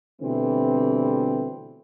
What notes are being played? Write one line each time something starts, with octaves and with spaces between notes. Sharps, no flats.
B2 D3 E3 G3 A3 C4